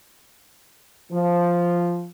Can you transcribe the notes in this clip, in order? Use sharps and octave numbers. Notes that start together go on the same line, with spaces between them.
F3